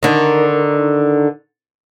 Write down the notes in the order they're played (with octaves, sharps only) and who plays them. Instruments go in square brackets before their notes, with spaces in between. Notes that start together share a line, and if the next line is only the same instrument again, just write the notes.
[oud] D3 D#3